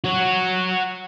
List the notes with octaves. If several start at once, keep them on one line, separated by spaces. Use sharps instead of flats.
F#4 C#5